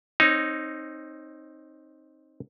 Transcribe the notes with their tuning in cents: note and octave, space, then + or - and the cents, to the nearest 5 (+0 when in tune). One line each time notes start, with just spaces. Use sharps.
C4 +20 D#4 +0 C#5 +0